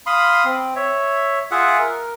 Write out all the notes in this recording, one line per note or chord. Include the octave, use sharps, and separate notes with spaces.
F5 B5 C6 D#6
C4
C#5 E5
F4 G#4 E5 F#5
A#4